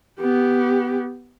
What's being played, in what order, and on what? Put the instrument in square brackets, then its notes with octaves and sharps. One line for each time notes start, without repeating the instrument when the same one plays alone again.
[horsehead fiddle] B3 G4